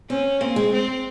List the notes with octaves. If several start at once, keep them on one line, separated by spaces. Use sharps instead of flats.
C4 C#4
A#3 C4
G#3
C4